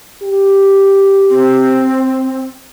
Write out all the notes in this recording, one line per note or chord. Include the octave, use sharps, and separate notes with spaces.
G4
C4